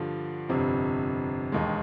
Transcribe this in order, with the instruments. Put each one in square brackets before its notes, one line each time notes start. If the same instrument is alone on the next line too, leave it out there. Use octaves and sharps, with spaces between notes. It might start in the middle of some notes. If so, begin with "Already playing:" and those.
Already playing: [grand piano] G2 D3 F3
G1 F2 C3
E1 D#2 D#3 G#3